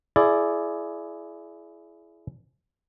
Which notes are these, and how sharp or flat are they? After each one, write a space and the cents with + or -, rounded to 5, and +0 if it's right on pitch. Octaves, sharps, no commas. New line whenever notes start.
E4 +20 G#4 +25 D5 +0